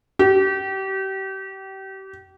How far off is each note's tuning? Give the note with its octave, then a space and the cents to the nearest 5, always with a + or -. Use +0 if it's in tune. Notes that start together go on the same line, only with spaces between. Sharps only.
G4 -30